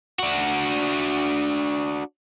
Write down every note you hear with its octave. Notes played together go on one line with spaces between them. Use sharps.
D4 F#4